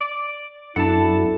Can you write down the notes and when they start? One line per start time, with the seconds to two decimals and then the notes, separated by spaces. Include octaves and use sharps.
0.01 D5
0.76 F#2 B3 D4 E4 A4 F#5 A5